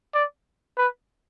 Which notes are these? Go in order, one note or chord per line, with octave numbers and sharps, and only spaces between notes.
D5
B4